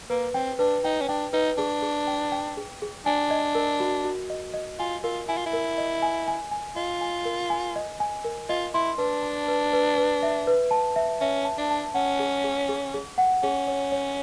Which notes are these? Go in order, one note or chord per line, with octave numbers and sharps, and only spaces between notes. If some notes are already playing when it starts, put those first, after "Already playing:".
A#3 B4
C4 G5
D4 B4
D#4 G5
C#4
D4 G5
D#4 B4
D4 G#4
G#4
G5
G5
G#4
G#4
D4 G#5
D#5
A#4
F#4
F#4
D#5
D#5
F4 G#5
F4 A#4
E4 G#5
F4
E4
A#4
D#5
G#5
G#5
G#5
F4 D#5
G#5
A#4
G#5
D#5
G#5
A#4
F4 D#5
E4 C6
D4 B4
A5
B4
B4
B4
E5
B4
A5
E5
C#4 E5
A5
D4
A5
C#4 F#5
G#4
G#4
G#4
G#4
F#5
C#4 G#4
C#5
C#5